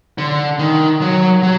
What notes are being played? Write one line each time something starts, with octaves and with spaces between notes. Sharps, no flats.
D3
D#3
F#3
F#3